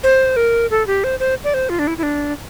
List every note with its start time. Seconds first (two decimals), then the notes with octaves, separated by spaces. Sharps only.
0.04 C5
0.36 A#4
0.71 A4
0.87 G4
1.04 C5
1.20 C5
1.44 D5
1.54 C5
1.70 F4
1.79 D4
1.87 E4
1.98 E4
2.03 D4